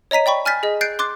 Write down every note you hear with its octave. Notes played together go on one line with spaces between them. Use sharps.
C#5 D#5 A#5 B6 D#7
D5 G5 B5 C#6
G#5 F6 G6 A6 B6
G#4 D#5
F#6 G6 A6 C7 D7
C6 D6 F#6 A6